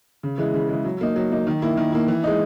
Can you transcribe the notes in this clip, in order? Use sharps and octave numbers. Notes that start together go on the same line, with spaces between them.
C#3
E3 G#3
C#3
E3 G#3
F#3
A#3 D#4
F#3
A#3 D#4
D#3
A#3 E4
D#3
A#3 E4
E3
G#3 D#4